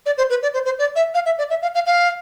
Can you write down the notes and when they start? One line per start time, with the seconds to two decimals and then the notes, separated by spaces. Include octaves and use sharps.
0.06 D5
0.18 C5
0.30 B4
0.43 D5
0.54 C5
0.65 C5
0.79 D5
0.96 E5
1.14 F5
1.26 E5
1.38 D5
1.50 E5
1.62 F5
1.75 F5
1.86 F5